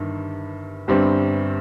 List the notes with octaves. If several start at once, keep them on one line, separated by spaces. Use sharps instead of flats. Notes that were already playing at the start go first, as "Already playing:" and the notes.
Already playing: G1 G2 D#3
G1 G2 G3 C4